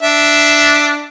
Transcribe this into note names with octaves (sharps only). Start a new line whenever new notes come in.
D4 E5